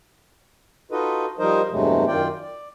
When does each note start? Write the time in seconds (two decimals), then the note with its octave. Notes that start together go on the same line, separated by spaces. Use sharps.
0.91 D#4 F4 F#4 A4 B4 D#5
1.39 F3 G3 D#4 A#4 C5 D#5
1.71 E2 G2 C3 F#3 G#3 A3
2.07 F#2 D#3 F4 D5 G5
2.41 D5